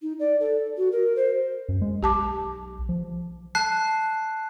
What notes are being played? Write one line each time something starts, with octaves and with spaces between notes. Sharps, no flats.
D#4
D5
A4
F#4
A#4
C5
F#2
G#3
B1 G4 A5 D6
F3
A5 F#6 C7